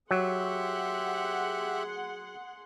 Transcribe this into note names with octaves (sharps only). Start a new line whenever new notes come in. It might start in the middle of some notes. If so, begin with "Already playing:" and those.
F#3 G4 G#4 E5 F#5 C6